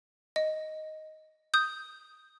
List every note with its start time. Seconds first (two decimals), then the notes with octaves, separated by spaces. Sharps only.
0.36 D#5
1.54 D#6 G6